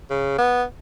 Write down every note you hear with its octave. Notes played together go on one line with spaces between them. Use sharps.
C#3
B3